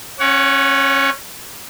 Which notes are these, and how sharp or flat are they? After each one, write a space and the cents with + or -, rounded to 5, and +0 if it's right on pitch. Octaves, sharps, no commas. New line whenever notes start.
C#4 -25 C#5 +25 F#5 +0